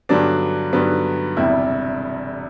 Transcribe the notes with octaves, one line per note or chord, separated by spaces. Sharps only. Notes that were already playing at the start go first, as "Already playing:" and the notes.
G2 D3 F#3 B3 D4
G2 D3 F#3 B3
E1 E2 C3 G3 E4